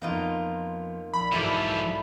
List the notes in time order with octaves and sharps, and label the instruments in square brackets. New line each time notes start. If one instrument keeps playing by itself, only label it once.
[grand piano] F2 B3 [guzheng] A#3 D#4 F4
[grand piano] A#1 [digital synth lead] B5
[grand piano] B1 G#2 [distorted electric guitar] E3 F3 [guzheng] E4 A4 D5